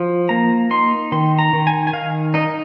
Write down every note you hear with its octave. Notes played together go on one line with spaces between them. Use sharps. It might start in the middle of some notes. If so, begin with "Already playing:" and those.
Already playing: F3
A#3 A#5
D#4 C6
D#3 C6
A#5
D#3
G#5
G#5
D#3 F5
D#4 D#5